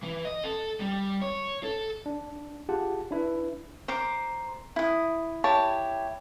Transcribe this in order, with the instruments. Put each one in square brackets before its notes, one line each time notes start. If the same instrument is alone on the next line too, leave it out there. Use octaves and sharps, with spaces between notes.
[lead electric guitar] E3
D#5
A4
G3
C#5
A4
[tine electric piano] D4
F4 G4 G#4 F#5 A5
D4 E4 B4
[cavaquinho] C5 A#5 D6
E4 D#6
E4 G4 C#5 A5